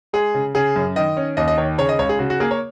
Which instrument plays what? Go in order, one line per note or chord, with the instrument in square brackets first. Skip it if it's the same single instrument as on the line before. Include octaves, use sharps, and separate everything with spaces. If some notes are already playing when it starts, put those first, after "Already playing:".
[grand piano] G#3 G#4
C#3
C#3 G#4
F#2
D#3 D#5
C#4
D#2 D#5
D#5
D#3 C#5
C#3 C#5
D#5
C#2 C#5
G#4
C#3 F#4
F#4
A#3 G#4
C#5